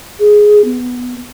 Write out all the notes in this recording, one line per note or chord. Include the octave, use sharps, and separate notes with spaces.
G#4
B3